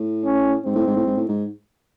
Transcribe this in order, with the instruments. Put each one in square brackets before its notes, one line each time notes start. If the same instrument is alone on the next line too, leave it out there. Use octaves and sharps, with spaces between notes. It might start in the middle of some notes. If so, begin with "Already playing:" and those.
Already playing: [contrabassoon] A2
[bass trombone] C#4
[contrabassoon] G#2 [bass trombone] C4
[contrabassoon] A2
G#2
A2
G#2
A2
G#2